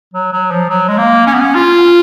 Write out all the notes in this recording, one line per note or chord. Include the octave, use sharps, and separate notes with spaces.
F#3
F#3
F3
F#3
G#3
A#3
C#4
B3
C#4
F4